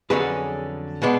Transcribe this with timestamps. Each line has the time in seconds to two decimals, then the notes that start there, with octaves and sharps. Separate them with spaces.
0.10 F2 D3 F#3 C#4 G#4 B4
1.02 B2 G#3 B3 D4